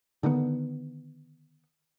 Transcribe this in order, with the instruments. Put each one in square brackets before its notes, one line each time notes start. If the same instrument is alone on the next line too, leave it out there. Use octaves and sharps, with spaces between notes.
[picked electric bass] D3 D#3 G3 B3